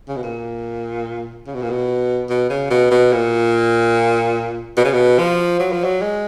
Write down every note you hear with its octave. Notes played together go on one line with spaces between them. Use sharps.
C#3
B2
A#2
C#3
B2
A#2
B2
B2
C#3
B2
B2
A#2
B2
C#3
B2
F3
F#3
F3
F#3
G#3